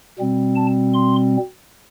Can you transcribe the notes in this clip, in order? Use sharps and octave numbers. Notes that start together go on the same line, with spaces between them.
B2 G3 C4
A5
C6